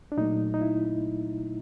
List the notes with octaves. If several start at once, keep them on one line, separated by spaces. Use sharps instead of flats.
D4
A#2 F#3 A3 D#4
D#4
E4